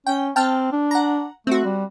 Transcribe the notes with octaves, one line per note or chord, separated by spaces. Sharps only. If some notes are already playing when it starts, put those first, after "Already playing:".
C#4 G5
C4 G5 A5 F6
D4
F#5 A#5
A3 C4 F#4
G3